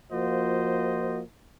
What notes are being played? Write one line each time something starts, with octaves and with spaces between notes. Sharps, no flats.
F3 A#3 F4 F#4 C5 D#5